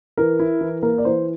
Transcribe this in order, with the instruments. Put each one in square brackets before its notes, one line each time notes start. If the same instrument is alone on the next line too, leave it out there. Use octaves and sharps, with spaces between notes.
[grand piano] E3 [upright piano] A#4
[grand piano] E4
E3
[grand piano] A#3 [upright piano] A#4
[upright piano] D5
[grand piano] E3 [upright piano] C5